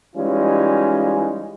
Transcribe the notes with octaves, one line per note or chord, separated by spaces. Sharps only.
E3 G3 G#3 C#4 D#4 F4